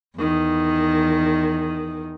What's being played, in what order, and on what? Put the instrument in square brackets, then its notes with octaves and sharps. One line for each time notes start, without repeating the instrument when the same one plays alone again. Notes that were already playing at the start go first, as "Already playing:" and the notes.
[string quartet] E2 D#3